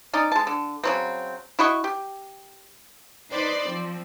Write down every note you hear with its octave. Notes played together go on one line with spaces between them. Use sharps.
C#4 D#4 D5
G#3 A5
D3
C#3 F#3 C4
E4 F#4 D#5 C#6
G4
D#4 B4 C5 D5 B5 C6
F3 C4